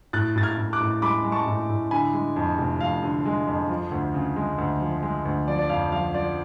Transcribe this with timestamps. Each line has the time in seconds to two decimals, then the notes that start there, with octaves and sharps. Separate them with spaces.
0.13 A2 F#6 A6
0.36 A2 A6
0.43 F6 G#6
0.58 A2
0.73 D6 F#6
0.80 A2
1.02 G#3 B5 D6
1.24 G#3
1.32 A5 C#6
1.47 A2
1.69 A2
1.91 D3 G#5 B5
2.14 G#3
2.36 F2
2.58 F1
2.80 F2 F5
3.03 D3
3.25 G#3
3.47 F2
3.69 F3
3.91 D2
4.14 C#3
4.36 G#3
4.58 D2
4.81 F3
5.03 G#3
5.25 D2
5.48 F3 D5
5.59 D5
5.69 F2 F5
5.92 F3 F5
6.14 F3 D5